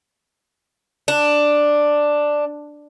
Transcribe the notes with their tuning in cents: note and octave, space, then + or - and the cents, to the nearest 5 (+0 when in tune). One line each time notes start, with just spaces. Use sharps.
D4 +5